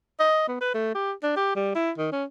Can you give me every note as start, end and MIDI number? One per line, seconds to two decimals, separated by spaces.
0.20 0.44 75
0.48 0.56 59
0.61 0.72 71
0.74 0.95 57
0.95 1.12 67
1.23 1.33 62
1.36 1.54 67
1.56 1.75 55
1.75 1.91 64
1.98 2.09 51
2.12 2.24 61